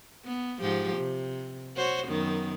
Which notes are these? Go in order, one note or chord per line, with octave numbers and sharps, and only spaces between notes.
B3
G#2 F3 G4
C3
F#4 C5 C#5
F#2 D#3 B3